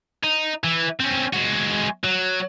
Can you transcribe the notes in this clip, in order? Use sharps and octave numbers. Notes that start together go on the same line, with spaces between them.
D#4
E3
C4 C#4
G#3 F#4
F#3